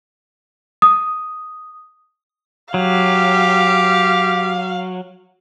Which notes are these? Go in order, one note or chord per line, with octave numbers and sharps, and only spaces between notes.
D#6
F#3 G4 F5